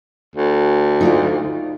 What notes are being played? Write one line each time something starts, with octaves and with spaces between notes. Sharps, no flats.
D2
D#4 F4 D5